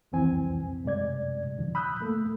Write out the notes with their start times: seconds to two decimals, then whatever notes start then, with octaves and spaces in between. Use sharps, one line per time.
0.12 C2 F2 E3 C4 G#5
0.84 F#2 C3 G#3 D5 G#6
1.56 D#2 G#2 D3 F3
1.75 B5 D#6 E6 F#6 G6
2.00 A3 A#3 A4